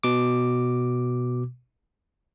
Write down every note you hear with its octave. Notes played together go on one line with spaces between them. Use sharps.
B2 D6